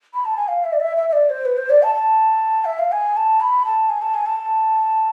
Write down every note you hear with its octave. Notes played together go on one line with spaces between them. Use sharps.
B5
A5
G#5
F5
E5
D5
E5
E5
E5
D5
C5
B4
C5
D5
A5
A5
E5
F5
G#5
A5
B5
A5
G#5
A5
G#5
A5